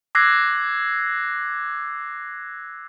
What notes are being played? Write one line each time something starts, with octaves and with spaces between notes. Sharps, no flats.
D6 E6 F#6 G#6 A#6 C7